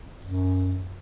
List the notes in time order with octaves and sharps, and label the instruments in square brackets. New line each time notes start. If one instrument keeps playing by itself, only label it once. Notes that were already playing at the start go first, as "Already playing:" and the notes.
[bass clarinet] F#2